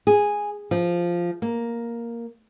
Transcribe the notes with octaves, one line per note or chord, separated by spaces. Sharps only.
G#4
F3
A#3